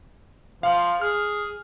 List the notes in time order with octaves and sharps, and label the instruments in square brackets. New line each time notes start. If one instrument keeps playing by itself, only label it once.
[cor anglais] F3 [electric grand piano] F5
[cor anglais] G#4 [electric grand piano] F6